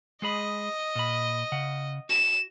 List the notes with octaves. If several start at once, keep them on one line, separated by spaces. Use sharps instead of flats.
G#3 G#4 D#5 B5
A#2 B5
C#3 F#5
F#4 E7